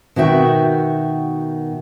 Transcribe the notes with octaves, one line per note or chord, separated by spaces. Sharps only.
B2 D#3 F#4 E5 G5